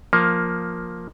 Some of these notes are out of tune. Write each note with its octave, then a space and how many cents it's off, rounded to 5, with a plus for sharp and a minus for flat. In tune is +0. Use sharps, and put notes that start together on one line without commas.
F3 +10 A#3 +0